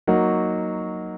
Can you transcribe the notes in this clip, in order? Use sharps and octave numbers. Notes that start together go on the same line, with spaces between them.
F#3 A#3 D#4 F#4